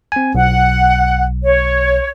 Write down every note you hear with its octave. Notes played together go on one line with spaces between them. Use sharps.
C4 G#5
B1 F#5
C#5